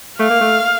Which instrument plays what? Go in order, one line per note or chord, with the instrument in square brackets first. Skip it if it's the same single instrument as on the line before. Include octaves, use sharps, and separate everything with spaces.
[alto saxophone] A3 [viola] F5
[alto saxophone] A#3
A3